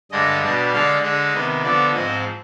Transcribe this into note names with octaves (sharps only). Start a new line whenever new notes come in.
G2 D3 G#3 D4 D#5
B2 G3 D4
D3 G#3 D4 F5
D3 G#3 D4 D#5
C3 D#3 B3
D3 F3 B3 D5
G#2 F3 C4 D#5